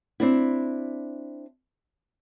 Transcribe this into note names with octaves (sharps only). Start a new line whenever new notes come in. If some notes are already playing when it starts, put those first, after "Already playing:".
C4 D4 E4